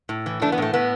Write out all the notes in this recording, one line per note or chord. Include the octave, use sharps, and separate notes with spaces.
A2
E3
E3 A3 D4
B3
A2 A3
A2 B3